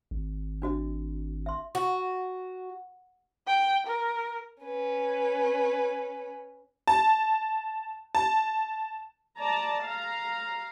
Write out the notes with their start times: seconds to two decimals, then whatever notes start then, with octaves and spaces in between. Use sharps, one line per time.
0.11 G#1
0.62 D4 F#4 D#5
1.46 E5 C6
1.75 F#4
3.47 G5
3.87 A#4
4.63 C#4 B4
6.87 A5
8.15 A5
9.39 D5 A5 A#5
9.85 F5 A#5